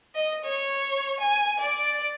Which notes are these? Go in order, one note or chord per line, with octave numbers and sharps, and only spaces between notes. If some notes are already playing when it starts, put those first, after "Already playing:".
D#5
C#5
G#5
D5